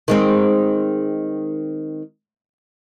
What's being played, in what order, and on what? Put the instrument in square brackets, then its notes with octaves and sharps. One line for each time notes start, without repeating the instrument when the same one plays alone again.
[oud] D#3 G#3 C4